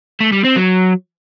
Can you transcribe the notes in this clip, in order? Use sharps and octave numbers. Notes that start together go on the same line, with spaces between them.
A3
G3
C4
F#3